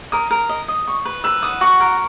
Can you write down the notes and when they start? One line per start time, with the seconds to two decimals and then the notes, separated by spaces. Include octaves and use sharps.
0.12 A#4 D#6
0.31 A#4
0.49 D#5
0.68 D#5
0.88 C#6
1.05 B4
1.24 B4 E6
1.42 F#5 D#6
1.61 F#4 C#6
1.80 A#4